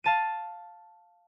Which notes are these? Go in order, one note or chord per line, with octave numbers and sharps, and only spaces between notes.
F5 A5 D#7